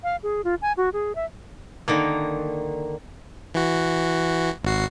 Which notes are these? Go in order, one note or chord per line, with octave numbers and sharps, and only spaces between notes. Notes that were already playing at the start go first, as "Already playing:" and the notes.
F5
G#4
F4
G#5
F#4
G#4
E5
D3 D#3 A#3
E3 F#4
G#1 F#4 C7